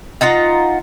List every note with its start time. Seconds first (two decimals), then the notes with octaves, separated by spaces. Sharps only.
0.21 D#4 F4 F#5 A#5